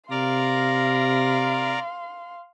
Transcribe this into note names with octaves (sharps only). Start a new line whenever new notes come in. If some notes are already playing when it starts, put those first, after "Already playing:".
C3 A#4 D5 F5 A#5 C6